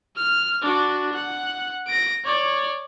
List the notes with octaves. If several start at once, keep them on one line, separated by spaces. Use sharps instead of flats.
F6
D4 F#4
F#5
A#6 D7
C#5 D5